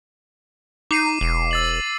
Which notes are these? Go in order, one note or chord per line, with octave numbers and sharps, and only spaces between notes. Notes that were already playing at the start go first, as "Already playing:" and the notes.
D#4 D6 C7 D#7
E1
E6 A6 F#7